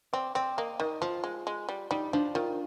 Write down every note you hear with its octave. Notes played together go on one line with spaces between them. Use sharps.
C4 D5
C4 D5
A#3 D#5
D#3 D#5
F3 F4
G#3
G#3
G3
G3 D#4
F3 D4
D#3 F4